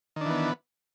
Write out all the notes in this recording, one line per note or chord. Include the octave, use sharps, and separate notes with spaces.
D#3 E3 B3 D4